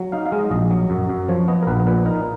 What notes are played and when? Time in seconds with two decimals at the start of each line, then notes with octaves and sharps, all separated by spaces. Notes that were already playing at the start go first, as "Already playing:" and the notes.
Already playing: F#3
0.12 D#4 F5
0.26 F5
0.32 G#3
0.39 D#5
0.51 A#1 D#5
0.71 F#3
0.90 F#2
1.09 F#2
1.29 F3 C#5
1.48 B3 D#5
1.63 A#4
1.67 A#1 B4
1.87 A#2 B4
2.06 D#4 A#4